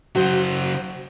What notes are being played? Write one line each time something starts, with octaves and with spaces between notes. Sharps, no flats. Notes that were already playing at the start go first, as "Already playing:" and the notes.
C#3 F#3 F#4 C5